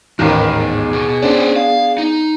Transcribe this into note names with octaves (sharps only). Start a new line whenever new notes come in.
A1 D#2 G#2 D#3 A#4 B4
B3 G#4
B2
C#4 D4 C5
F5
D#4